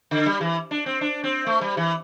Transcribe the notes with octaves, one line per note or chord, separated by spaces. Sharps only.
D3
G3
E3
D4
C4
D4
C4
A3
G3
E3